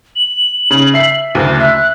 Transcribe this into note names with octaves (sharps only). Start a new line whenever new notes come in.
F#7
C#3
E5 C7
F#1 D2 D6
E5 F#6